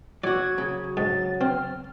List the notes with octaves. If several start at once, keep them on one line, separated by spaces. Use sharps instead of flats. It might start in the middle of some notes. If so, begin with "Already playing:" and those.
F#3 F#4 D5 G#6
C#3 F#3
G#2 A6
C4 F6